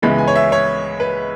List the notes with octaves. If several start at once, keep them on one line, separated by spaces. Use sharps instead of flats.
C#2 C#3 E3 G#3 B3 B5
G#5
C#5
E5
C#5
B4